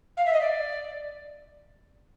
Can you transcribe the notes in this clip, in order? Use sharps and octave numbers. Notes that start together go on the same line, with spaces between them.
F5
E5
D#5
D5